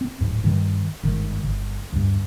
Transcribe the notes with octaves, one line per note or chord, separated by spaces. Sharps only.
C4
D1 G#2
G2 D#3
G1 G#2 D#3
G1
D2 G2